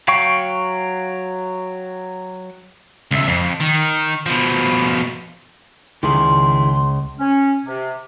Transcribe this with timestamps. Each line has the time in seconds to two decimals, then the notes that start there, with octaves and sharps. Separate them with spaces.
0.08 F#3 F5 G5 C#6
3.11 C#2 E5
3.27 F2
3.61 D#3
4.26 B2 F3
6.03 C#2 D#3 E4 G#4 C6
7.20 C#4
7.66 C3